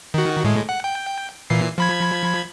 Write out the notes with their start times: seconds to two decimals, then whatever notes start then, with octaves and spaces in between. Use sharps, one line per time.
0.14 D#3 F#4
0.44 A2 G#3
0.69 F#5
0.84 G5
1.50 A#2 E3 C7
1.78 F3 B5 G#6